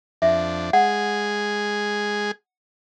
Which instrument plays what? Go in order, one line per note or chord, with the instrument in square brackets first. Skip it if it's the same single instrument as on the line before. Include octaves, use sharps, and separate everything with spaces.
[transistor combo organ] F2 D4 [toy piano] E5
[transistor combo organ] G#3 G#4 [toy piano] F#5